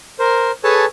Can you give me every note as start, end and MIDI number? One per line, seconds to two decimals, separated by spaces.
0.19 0.51 70
0.19 0.51 72
0.64 0.85 68
0.64 0.85 69
0.64 0.85 71
0.64 0.85 73
0.64 0.85 80
0.64 0.85 81